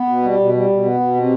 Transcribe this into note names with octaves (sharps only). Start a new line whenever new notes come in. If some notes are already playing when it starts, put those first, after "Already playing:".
Already playing: B3
B2
G3
B2
G3
B2
B3
B2
C3